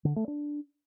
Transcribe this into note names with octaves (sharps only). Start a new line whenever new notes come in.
D3
A3
D4